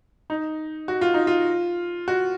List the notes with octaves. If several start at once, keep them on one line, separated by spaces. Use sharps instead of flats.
D#4
F#4
F4
D#4
F4
F#4